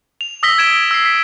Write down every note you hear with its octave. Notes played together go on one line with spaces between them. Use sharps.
F7
D#6 E6 A#6 B6 G7
G#6 D7 E7
E6 C7
B6